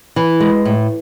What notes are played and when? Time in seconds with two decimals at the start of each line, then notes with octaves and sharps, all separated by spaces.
0.16 E3
0.40 G#3
0.65 A2